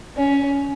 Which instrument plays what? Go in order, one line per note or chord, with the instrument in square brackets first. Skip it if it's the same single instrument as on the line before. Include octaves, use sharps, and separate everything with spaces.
[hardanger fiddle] C#4